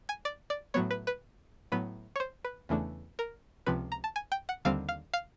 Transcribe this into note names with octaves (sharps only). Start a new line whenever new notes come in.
G#5
D5
D5
A2 F#3 B3 C#5
B4
B4
A2 F#3 B3 B4
C#5
C5
B4
E2 C#3 E3 A3 D4
A#4
C#2 C3 F3 B4
A#5
A5
G#5
G5
F#5
D#2 D3 G3 C4 F5
F5
F5